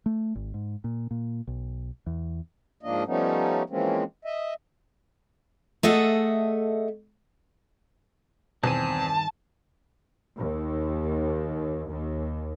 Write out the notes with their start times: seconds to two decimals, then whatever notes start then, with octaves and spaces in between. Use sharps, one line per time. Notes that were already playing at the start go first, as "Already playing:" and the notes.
0.06 A3
0.35 G#1
0.54 G#2
0.84 A#2
1.11 A#2
1.47 B1
2.06 E2
2.83 G#2 F3 A#3 D4 D#5
3.06 F3 G3 A3 B3 C#4 D#4
3.70 E3 F3 G#3 A#3 C4 C#4
4.25 D#5 E5
5.83 A3 G#4 A4 D#5 E5 F#5
8.63 E2 G2 B2 D#3 C4 G#5 A5 D#7
10.38 D#2
11.90 D#2